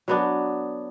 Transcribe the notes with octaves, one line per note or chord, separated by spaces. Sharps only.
F#3 B3 D4